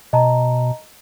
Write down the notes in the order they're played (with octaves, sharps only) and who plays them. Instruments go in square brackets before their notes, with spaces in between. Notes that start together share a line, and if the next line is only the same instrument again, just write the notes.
[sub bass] B2 [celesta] D#5 A5 A#5